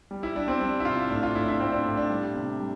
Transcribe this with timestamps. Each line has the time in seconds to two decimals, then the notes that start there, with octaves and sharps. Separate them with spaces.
0.11 G3
0.23 E4
0.35 G3 D4
0.48 C4
0.61 G3 D4
0.80 E4
0.85 C3 F4
1.10 A2 D4
1.23 F4
1.35 A2 E4
1.43 D4
1.48 E4
1.60 A2 C4
1.72 D4
1.85 A2
1.97 D4
2.10 G3
2.35 C3
2.60 G3